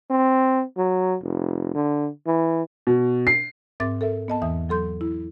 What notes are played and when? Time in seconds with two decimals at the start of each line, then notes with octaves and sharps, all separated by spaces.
0.10 C4
0.77 F#3
1.22 F1
1.75 D3
2.27 E3
2.87 B2
3.27 C7
3.80 G#2 C4 A#4 E5 D6 A6
4.01 A4 A#4 E5
4.28 B3 D#5 A5
4.42 E2 E3 E5 D#6
4.69 F#3 A4 C6 G6
5.01 E4